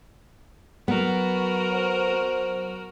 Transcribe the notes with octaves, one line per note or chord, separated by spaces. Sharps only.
F#3 B3 F#4 A#4
C5